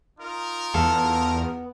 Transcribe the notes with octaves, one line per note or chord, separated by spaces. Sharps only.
D#4 F4 A#4
E2 B3 A4 F5